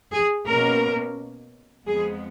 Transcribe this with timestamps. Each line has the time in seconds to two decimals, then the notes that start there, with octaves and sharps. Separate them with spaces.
0.12 G#4
0.47 B2 A#3 C#4 A#4
1.87 F2 F3 G#3 B3 G#4